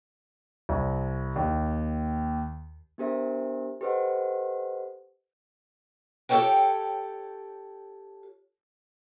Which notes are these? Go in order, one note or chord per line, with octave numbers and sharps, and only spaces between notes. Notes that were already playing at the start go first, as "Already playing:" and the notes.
C2
D#2
B3 D4 G4 A#4 C5 E5
G4 A4 B4 C5 D#5 F#5
G4 A4 A#4 C5 C#5 G5